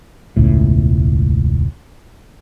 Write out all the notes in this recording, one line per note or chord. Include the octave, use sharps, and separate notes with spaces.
E1 C#2 A2